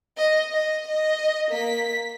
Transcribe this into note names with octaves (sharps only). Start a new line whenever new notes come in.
D#5
D#5
D#5
A#3 B6